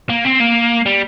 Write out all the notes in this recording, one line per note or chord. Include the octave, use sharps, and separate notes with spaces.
A#3
C4
A#3
G3